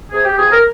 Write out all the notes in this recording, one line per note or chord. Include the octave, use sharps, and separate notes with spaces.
C3 G#4
G4
F3 C4 G#4
A#4